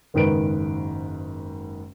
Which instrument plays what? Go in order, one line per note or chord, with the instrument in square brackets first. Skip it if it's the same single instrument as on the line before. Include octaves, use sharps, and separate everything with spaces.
[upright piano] F#1 G#2 D#3 B4 D7